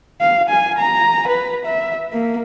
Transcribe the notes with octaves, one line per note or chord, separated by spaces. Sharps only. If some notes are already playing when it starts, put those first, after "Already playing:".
F5
G#5
A#5
B4
E5
A#3